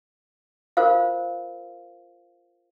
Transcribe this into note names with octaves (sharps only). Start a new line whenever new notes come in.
F4 A#4 C5 F5